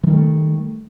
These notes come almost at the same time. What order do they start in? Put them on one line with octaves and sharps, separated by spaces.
E3 D#3 G3 A3